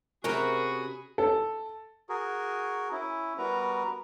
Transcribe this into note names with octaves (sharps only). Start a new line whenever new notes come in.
C3 C#4 F#4 G#4 A#4 G5 B5
A4
F#4 G#4 A#4
C#4 E4
G3 B3 F#4 A#4 B4 A#5